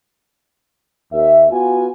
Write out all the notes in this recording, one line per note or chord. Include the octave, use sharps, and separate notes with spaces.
D#2 E5
B3 F4 F#4 G#5